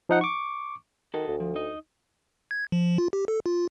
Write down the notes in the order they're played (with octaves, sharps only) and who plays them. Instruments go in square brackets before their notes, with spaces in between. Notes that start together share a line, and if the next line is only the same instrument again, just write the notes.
[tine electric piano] F3 D#4 F#5
C#6 D6
[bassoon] D#3 [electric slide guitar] F#4 A4 D#5
[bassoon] D2
[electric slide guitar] F3
D#4 D#5
[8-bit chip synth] G#6
F3
F4
G4
A4
F4